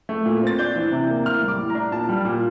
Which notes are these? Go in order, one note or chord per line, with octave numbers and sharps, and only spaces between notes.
A3
A#2
C4 A6
D4 G6
E3
C3
A#3
A2 F6
G3
D6
A2
A#5
D4
A#2 A5
G3
A#2